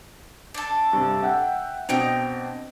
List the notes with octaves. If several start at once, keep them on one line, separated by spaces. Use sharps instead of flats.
D4 A4
G2 C3
E5 F#5 G5
B2 C4 D4 D#5 G5 A#5